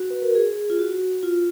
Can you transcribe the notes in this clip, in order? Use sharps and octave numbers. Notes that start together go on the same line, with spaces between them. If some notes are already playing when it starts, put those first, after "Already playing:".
Already playing: F#4
B4
A#4
G#4
F4
F#4
F4